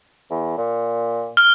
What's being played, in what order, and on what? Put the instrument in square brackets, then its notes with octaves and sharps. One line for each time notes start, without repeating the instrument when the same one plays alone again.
[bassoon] E2
A#2
[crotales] F6 G7